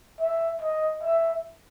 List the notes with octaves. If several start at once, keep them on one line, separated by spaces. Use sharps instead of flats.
E5
D#5
E5